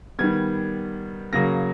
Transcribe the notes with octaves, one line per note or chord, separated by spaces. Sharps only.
D#3 G3 B3 G#6
C#3 F#3 A#3 A#6